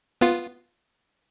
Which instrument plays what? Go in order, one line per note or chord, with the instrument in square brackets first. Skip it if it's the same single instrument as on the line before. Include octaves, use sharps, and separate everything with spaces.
[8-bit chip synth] B3 F4